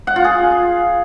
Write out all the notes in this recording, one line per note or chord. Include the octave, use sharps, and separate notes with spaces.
F#5
F4
G#4